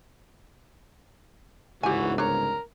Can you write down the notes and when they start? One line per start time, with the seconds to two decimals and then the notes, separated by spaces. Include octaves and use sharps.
1.83 G1 C#2 G#2 E3 F#4 G4 G#5
2.18 D4 A#4 C#5